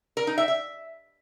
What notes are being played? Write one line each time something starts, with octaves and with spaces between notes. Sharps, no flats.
A#4
D#4
E5
E5